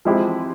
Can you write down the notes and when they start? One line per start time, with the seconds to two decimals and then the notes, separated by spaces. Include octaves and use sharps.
0.05 F3 G#3 C4 E4 G4